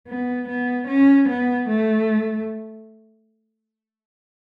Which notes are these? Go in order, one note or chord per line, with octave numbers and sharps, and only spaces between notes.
B3
B3
C#4
B3
A3